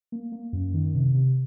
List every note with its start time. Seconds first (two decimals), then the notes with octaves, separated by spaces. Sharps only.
0.12 A#3
0.32 A#3
0.53 F#2
0.74 D#3
0.94 C3
1.15 C3